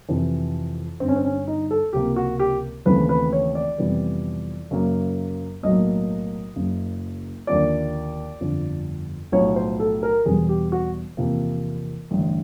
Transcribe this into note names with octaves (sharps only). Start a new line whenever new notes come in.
F2 C3 E3
G1 G2 D3 C4
C#4
C4
C#4
D#4
A4
C#2 C3 F3 A#3 G4
F#4
G4
D#2 C#3 E3 A3 C4 B4
B4
C#5
D5
F2 C3 E3 G3 B3
F#2 C#3 F#3 A#3
B1 A2 F#3 A#3 D#5
F#1 F#2 C#3
D#2 D3 F3 A#3 D5
G1 F2 D3 F3
B1 A2 F3 C#5
C5
A4
A#4
E1 E2 B2 G3 B3 G#4
G4
F#4
E2 C3 F3 A#3
A1 G2 D3